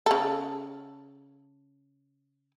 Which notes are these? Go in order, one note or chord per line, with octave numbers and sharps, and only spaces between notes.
C#3 A4